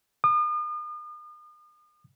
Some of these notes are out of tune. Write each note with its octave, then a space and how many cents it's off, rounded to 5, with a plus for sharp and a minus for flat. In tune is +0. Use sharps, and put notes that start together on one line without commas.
D#6 -40